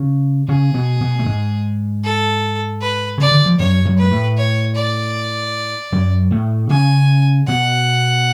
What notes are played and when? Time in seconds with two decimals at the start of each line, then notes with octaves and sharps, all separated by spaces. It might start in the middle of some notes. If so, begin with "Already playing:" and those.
Already playing: C#3 C#4
0.48 C#3 C#4 G#4
0.74 B2 B3
1.01 B2 B3
1.19 A3
1.26 G#2 G#3
2.04 A4
2.81 B4
3.18 C#3 D5
3.31 D3
3.46 F3
3.59 F#2 F#3 C#5
3.85 F#2 F#3
3.98 G#3 B4
4.11 A2 A3
4.37 C#5
4.75 D5
5.92 F#2 F#3
6.31 A2 A3
6.70 C#3 C#4 G#5
7.47 B2 B3 F#5